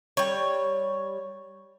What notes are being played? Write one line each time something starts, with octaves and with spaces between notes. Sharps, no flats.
G3 C#5